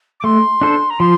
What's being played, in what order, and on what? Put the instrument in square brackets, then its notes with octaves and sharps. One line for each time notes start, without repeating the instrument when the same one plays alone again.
[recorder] D6
[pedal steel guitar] A3 [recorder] C6
[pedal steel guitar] D4 A4 C5
[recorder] A#5
[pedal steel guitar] F3 [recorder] C6